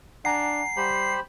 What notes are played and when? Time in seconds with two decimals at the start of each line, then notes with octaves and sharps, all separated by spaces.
0.25 D4 F#5 G#5 A#5 C7
0.77 G3 G4 C5 B5